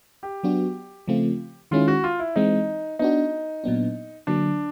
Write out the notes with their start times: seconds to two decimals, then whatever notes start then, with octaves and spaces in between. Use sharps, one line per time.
0.23 G4
0.44 F#3 B3 D4 F#4
1.08 C#3 F3 A3 C4 F4
1.71 D#3 G#3 C#4 E4 F4
1.88 F#4
2.04 F4
2.20 E4
2.36 E3 G#3 C4 D#4
2.99 B3 D4 D#4 F#4
3.64 A#2 F#3 B3 D4
4.27 D3 F#3 A#3 D4